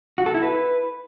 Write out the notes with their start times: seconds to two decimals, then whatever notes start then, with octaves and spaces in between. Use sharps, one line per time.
0.18 F#4
0.26 A4
0.34 E4
0.43 B4